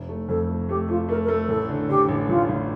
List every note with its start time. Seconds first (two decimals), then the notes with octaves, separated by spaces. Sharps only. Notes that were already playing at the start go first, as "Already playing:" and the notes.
Already playing: F1
0.09 A3
0.28 F2 A4
0.49 A3
0.69 A3 G4
0.89 A3 F4
1.09 A3 A#4
1.24 A#4
1.28 A3 A4
1.49 A1 A4
1.69 D3
1.89 D3 G4
2.09 A1
2.29 A1 F4
2.49 A1